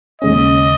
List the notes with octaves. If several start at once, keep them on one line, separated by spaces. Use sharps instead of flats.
D#2 C#3 G#3 C#4 D#5